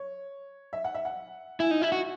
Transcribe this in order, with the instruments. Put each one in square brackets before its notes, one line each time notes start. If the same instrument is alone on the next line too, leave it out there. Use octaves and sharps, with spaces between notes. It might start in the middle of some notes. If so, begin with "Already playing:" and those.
Already playing: [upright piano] C#5
E5
F#5
E5
F#5
[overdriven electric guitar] E4 [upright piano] G#5
[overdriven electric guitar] D#4
E4
F#4